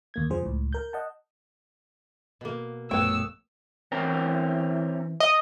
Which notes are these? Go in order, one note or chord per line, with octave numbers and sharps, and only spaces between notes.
D#2 A#3 G#6
F2 C#3 F3 G#4 C5
C#2 A2
A#4 G6
D#5 F#5 A5
B2 A#3
A#1 F#2 A3 B3 C#5 G5 E6
E3 C4 C#4 A#4
D#5